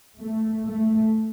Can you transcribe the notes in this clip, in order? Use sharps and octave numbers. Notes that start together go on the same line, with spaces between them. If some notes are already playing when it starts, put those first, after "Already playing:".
A3
A3